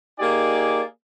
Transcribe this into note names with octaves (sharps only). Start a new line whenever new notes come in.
A#3 D#4 G4 G#4 D5 G#5